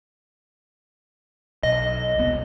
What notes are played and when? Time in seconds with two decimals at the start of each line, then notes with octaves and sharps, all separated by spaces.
1.63 B1 D#5
2.16 E1 C2 B3